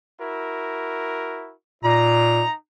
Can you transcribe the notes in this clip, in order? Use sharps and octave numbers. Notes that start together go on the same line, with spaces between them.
E4 F#4 A#4
A#2 D#4 A#5